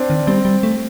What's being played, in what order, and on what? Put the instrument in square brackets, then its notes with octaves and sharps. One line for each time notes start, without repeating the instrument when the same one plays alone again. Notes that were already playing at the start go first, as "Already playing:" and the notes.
Already playing: [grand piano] C4 D4
[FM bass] D#3
[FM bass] G3 [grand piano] C4
[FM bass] G3
A3